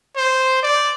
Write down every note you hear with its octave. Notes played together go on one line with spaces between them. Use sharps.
C5
D5